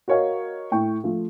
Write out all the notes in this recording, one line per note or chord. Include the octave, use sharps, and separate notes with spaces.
F#4 A#4 C#5 D#5 F5
A2 G5 C#6
F3 A3